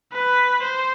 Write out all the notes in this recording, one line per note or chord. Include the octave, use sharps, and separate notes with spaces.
B4
C5